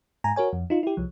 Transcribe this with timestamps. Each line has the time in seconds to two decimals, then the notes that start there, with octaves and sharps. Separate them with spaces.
0.24 G#2 G#5 A#5
0.36 F#4 A#4 C#5 G#5
0.53 F2
0.70 D#4 F4
0.83 E4 G4
0.97 C2 F3